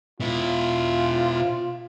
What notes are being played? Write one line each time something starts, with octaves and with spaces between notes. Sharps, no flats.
B2 E4 F4